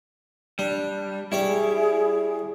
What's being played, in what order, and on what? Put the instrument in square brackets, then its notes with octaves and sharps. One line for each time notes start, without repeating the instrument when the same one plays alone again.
[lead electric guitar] G3 [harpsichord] D4
[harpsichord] G3 C#5 D5 [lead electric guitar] E4 [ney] G#4